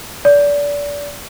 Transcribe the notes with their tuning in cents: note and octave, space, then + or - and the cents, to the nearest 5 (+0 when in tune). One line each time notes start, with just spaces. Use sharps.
D5 -30